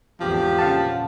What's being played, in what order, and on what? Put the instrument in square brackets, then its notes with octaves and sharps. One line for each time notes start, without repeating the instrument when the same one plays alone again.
[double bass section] G#1 E2 D3 [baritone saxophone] F3 [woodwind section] G4
[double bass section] A#2 C#3 [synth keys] F5 F#5 A5